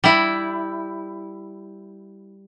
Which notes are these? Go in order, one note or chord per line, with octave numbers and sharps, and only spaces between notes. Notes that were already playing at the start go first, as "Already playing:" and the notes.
G3 E4